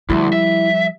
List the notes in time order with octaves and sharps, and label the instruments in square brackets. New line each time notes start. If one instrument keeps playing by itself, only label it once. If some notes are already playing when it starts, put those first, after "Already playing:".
[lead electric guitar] D2 [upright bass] F3 G3 [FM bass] E4
[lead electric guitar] E5